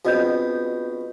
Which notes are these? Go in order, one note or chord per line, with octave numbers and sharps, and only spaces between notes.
A#1 F2 B2 F#4 D#5 G6